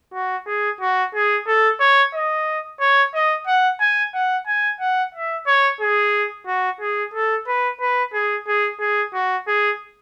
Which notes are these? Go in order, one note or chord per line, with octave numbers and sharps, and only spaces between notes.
F#4
G#4
F#4
G#4
A4
C#5
D#5
C#5
D#5
F#5
G#5
F#5
G#5
F#5
E5
C#5
G#4
F#4
G#4
A4
B4
B4
G#4
G#4
G#4
F#4
G#4